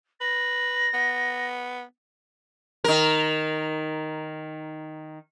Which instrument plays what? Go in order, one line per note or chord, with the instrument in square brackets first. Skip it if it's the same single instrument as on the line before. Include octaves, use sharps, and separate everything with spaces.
[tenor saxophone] B4 [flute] A#6
[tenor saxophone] B3
[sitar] D#3 A#4